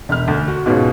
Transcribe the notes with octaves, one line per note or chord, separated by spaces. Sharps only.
E1 F6
D2
F#4
G#2 B2 C#4 F4 F#4 G#4